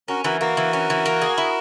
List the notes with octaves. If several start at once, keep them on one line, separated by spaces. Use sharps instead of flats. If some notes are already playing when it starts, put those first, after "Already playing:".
C#4 F#4 A#4
E3 F#4 A#4
A#3 F#4 A#4
E3
C#4
E3
A#3
G#4
E4